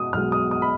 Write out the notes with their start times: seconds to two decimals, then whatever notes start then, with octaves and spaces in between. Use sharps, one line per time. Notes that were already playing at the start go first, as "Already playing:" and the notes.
Already playing: B2 G#3 D#6
0.13 B1 B2 G#3 F6
0.32 D#6
0.51 D#6
0.62 B5